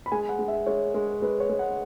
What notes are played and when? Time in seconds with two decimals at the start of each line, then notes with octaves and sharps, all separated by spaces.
0.06 B5
0.12 G#3 G#5
0.29 F#5
0.39 G#3
0.48 E5
0.66 G#3 C#5
0.94 G#3
1.22 G#3 B4
1.40 C#5
1.50 G#3
1.59 F#5